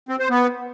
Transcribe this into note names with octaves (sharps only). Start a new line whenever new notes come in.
C4
C5
B3